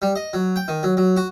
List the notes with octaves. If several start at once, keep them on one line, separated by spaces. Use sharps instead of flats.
G3
D#5
F#3
G5
D#3
F#3
F#3
F#4